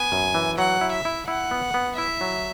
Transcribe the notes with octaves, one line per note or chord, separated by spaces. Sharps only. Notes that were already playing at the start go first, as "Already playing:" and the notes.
Already playing: B3 G#5
F#2
E3
F#3 F#5
E4
E5
E4
E4 F#5
B3
B3
E4 E5
F#3